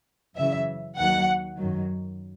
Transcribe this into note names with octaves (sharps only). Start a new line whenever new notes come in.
F#2 C#3 E3 E5
D#2 D#3 F#3 F#5
F#2 D#3 F#3